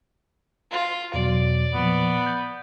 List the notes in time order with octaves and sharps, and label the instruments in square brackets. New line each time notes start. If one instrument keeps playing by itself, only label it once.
[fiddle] F4
[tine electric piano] E2 B2 F#3 [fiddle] D5
[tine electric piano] A#2 F3 [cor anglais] B3
[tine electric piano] G6